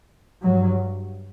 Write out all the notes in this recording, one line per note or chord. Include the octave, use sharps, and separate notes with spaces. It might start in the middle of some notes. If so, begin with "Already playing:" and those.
G2 F#3